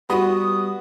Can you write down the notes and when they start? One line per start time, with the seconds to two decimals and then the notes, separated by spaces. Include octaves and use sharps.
0.10 G3 B3 F#4 B5 D#6